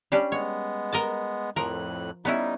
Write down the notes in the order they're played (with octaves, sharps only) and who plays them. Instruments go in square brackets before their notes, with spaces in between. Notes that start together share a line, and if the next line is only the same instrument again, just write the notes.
[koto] G3 C#4 D4
[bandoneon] G#3 B3 [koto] C#5
[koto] A#4 D#5 A5
[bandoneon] F2 A2 F#6 [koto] F3 A#4
[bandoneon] G3 D#4 [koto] B3 C#4 E4